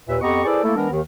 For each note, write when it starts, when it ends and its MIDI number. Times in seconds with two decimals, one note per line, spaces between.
0.08 0.17 39
0.08 0.17 46
0.08 0.17 71
0.08 0.17 76
0.21 0.44 41
0.21 0.44 59
0.21 0.44 67
0.21 0.44 75
0.21 0.44 82
0.21 0.44 85
0.45 0.61 64
0.45 0.61 68
0.45 0.61 69
0.45 0.61 71
0.45 0.61 72
0.45 0.61 74
0.64 0.73 57
0.64 0.73 58
0.64 0.73 64
0.64 0.73 69
0.75 0.89 52
0.75 0.89 56
0.75 0.89 59
0.75 0.89 62
0.75 0.89 70
0.91 1.00 39
0.91 1.00 51